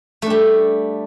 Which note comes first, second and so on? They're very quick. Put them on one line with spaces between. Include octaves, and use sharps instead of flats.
A3 D4 G3